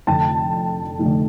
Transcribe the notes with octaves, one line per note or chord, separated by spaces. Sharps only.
F1 F2 D3 G5 A5
F1 F2 D3